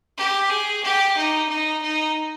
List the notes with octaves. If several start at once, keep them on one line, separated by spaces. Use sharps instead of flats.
G4
G#4
G4
D#4
D#4
D#4